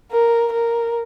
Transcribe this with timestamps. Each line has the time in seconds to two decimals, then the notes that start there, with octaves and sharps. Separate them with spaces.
0.11 A#4
0.52 A#4